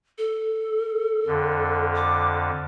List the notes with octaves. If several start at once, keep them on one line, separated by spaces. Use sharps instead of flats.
A4
F2 D3
D6